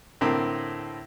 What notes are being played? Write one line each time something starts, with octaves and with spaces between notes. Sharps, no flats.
A2 D3 A#3 C4